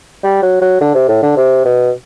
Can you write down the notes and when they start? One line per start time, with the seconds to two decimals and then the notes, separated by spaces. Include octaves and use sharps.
0.23 G3
0.43 F#3
0.61 F#3
0.81 D3
0.95 C3
1.08 A2
1.22 D3
1.37 C3
1.65 B2